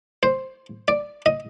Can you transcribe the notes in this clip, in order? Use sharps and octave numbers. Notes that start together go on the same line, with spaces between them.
C5
D5
D#5